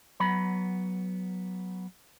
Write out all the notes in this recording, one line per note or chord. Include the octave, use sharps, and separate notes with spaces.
F#3 B3 B5